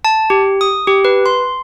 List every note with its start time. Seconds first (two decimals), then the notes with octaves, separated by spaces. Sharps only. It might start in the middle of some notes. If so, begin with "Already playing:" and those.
0.05 A5
0.30 G4
0.61 D#6
0.87 G4
1.05 B4
1.26 C6